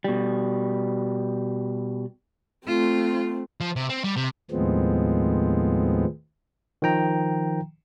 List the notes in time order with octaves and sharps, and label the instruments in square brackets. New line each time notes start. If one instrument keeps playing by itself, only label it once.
[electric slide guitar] B2 G3
[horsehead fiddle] A3 C4 [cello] F4
[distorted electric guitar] F3
C3
C4
G3
C3
[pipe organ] D#2 A2 F3 G#3 B3 C4
[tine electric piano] D#3 F3 G5 A#5